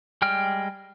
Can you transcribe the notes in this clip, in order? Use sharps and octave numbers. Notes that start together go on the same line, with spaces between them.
G3 G#3 G5 F6